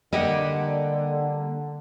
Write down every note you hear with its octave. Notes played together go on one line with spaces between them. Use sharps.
D3 G3 A#3 G4 D#5 F#5